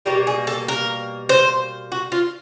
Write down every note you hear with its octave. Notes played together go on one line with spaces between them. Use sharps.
B2 G3 A#3 G4
G#4
A4
A#4
C5
F#4
F4